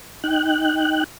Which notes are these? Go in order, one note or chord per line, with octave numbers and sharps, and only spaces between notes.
D#4 G5 F#6